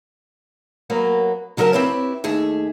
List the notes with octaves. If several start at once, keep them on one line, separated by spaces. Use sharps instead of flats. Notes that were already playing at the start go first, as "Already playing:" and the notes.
F#3 A#3 B3
C#3 F#3 G3 G4 A#4 A5
C4 E4 G4 B4 C#5
D#2 A3 G#4 E5